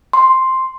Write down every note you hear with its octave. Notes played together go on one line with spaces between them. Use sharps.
C6